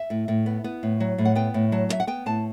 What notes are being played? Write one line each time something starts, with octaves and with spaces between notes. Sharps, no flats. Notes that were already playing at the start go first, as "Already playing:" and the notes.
Already playing: E5
A2
A2
B3
B3
A2
F#3
A2
F#5
B3 G5
A2
F#3 A5
B3
E5
F#5
B3 G5
A2 A5